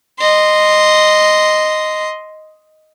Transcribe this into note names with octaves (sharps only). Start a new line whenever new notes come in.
D#5 C6